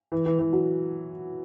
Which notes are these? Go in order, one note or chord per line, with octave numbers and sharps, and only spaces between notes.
E3
E3
E3
F#3